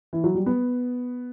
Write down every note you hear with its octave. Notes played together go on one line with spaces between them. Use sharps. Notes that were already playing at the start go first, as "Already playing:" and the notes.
E3
F#3
G3
B3